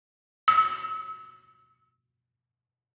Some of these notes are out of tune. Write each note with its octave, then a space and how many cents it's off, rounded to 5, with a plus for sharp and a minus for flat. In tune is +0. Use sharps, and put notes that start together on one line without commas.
E6 -35